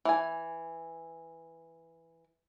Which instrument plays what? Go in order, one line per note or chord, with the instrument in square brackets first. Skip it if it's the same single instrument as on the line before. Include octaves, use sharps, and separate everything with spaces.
[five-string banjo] E3 G#5